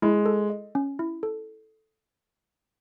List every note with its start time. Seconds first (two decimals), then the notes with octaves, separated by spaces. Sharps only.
0.02 G#3 E4
0.26 A4
0.50 D#5
0.75 C#4
0.99 E4
1.23 A4